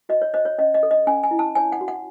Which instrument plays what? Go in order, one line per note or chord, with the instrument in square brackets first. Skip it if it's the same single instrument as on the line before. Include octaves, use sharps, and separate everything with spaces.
[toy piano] F#4 D#5
C#5
C5 D#5
C#5
C#4 D#5
D#5
A4
D#5
C#4 G#5
G#5
E4
A5
C#5 G#5
F#5
F#4
F#5